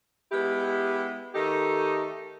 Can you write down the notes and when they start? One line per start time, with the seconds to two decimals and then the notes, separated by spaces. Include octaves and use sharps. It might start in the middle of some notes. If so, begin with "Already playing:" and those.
0.32 G#3 B3 E4 G4
1.35 D#3 A3 D#4 G4 A4